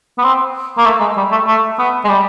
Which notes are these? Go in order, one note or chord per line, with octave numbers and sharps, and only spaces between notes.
B3
C4
A#3
A3
G#3
G3
A3
A3
B3
G#3
G3